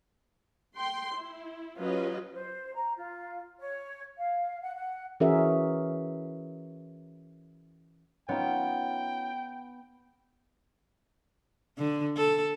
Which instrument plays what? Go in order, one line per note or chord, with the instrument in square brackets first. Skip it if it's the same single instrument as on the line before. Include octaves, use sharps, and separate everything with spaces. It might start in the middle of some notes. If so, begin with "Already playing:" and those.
[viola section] G5 C6
E4
F#3 C#4 F4 G4 B4 D#5
[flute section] C5
A#5
F4
C#5
F5
F#5
F#5
[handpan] E3 C#4 F#4 G#4 A#4 E5
[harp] B3 [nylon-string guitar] C#4 D#4 F4 [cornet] G5
[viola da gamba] D3
A4